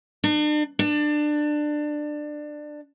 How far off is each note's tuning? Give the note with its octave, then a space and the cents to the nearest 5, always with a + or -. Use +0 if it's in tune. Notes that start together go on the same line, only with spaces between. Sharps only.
D4 +40
D4 +20